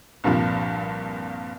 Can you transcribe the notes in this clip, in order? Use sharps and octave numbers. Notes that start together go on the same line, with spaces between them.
C2 G2 A#2 F3